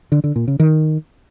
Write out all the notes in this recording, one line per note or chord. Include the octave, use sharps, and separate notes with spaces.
D3
D3
A#2
C#3
D#3